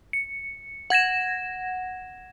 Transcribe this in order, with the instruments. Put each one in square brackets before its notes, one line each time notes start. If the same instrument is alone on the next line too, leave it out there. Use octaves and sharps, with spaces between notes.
[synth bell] C#7
F#5 G#6 A#6 E7